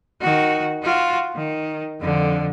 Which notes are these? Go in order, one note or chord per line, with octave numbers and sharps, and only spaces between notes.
D#3 F#4
F4 F#4
D#3
F2 D3